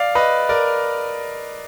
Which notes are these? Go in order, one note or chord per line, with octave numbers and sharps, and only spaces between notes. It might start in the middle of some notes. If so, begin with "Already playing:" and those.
Already playing: D5 F5
B4 D#5
A#4 D5